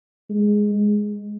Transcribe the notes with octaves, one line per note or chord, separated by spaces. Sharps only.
G#3
G#3